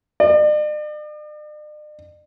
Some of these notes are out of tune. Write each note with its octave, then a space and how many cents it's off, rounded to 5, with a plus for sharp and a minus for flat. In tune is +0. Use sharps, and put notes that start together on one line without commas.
D5 +45